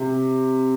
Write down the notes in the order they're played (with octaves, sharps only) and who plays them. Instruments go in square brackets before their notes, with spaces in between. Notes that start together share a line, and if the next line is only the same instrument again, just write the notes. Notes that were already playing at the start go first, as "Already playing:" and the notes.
Already playing: [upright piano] C3